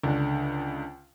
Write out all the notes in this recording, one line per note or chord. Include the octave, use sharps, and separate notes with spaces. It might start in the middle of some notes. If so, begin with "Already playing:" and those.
C#2 D3